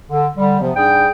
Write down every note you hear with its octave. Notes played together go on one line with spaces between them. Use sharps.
D3
D3 G3
C3 F3 B3
G#2 G3 D4 G#4 G5